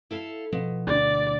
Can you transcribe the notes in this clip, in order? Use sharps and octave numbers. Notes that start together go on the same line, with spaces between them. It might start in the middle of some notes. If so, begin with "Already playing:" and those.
E4 A4 F5
B2 F3
D2 D4 D5